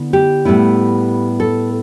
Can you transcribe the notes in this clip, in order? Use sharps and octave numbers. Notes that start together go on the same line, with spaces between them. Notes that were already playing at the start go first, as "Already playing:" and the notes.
Already playing: D3 B3 E4
G4
A2 G3 B3 E4
A4